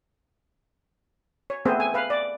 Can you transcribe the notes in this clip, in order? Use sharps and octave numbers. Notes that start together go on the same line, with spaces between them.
C#5
A3 B3 C4 G#4 C5
G#5
B4 F5
D5